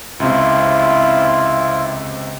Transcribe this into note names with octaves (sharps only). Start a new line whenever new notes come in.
C#2 C3 E4 F4